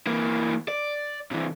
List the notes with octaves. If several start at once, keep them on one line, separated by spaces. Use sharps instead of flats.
E3 A#3
D5
C3 E3